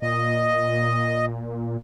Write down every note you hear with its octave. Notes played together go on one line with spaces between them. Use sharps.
A#2 D#5